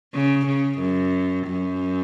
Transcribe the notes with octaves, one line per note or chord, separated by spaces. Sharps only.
C#3
C#3
F#2
F#2